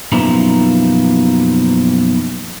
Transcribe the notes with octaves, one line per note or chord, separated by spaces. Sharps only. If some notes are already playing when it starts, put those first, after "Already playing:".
F#2 B2 F3 A#3 D#4 E4